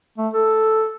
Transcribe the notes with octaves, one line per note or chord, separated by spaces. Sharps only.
A3
A4